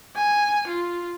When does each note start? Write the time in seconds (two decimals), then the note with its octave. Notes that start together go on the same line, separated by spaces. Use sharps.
0.16 G#5
0.67 F4